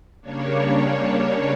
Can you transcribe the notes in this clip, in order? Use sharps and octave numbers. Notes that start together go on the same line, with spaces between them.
C#3 G3 A#3 D4 C#5